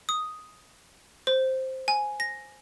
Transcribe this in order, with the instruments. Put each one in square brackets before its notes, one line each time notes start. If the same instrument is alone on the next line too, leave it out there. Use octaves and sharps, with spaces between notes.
[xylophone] D#6
C5
G#5
A#6